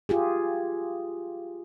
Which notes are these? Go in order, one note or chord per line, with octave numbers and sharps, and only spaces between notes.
F4 G4 G#4